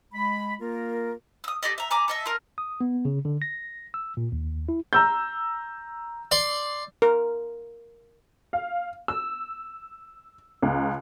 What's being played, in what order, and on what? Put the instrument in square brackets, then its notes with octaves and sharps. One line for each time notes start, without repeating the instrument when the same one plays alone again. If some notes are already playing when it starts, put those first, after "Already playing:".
[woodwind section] G#3 B5
A#3 F4 A#4
[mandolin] D#6 E6
G4 A4 D5 D#5
E5 A#5
G#5 A#5 B5 D6
A4 D#5 E5
F4 A#4
[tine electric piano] D#6
B3
C#3
D3
A#6
E6
A#2
D#2
E4
[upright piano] A#5 E6 G6
[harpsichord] D5 C6
[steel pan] A#4
[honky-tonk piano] F5
E6
C#2